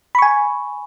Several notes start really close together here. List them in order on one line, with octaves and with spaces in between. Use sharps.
B5 C#6 G#5